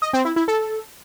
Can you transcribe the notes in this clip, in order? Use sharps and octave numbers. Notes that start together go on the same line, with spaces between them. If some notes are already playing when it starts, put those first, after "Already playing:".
D#5
C4
E4
E4
A4